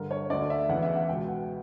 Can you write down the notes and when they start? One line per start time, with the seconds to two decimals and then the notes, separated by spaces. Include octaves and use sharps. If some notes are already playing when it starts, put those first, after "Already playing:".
Already playing: G2 D3 A#4
0.11 C#5
0.30 D2 D3 D5
0.50 E5
0.69 E2 C#3 E3 F#5
0.83 E5
0.96 F#5
1.09 C#2 B2 G5
1.28 F#5